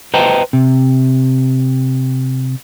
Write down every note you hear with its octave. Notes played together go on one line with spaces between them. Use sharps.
B4 C5 D#5 G5 A5 A#5
C3